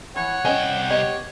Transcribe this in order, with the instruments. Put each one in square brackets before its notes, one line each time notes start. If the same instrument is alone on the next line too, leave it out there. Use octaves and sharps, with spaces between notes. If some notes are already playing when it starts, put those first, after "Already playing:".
[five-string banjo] E3 [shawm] C#5 [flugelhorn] F#5
[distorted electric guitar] C2 G5 [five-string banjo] C#4 D#5 G#5
[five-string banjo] B3 G4 D#5 [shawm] C#5